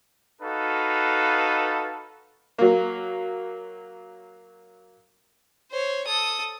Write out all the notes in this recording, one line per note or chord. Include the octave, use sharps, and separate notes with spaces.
D#4 F#4 A4 B4 F5
F#3 A#3
C5 C#5
A4 D#6